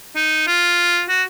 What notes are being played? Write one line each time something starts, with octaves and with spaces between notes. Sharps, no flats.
D#4
F4
F#4